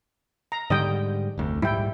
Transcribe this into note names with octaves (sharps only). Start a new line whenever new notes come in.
A#5
G#2 D3 G3 D#5 G5
F1 D2
A#1 G#2 G3 E4 G5